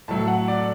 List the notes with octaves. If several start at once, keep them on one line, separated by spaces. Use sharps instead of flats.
A2 F#3 A3 A5
F#5
D5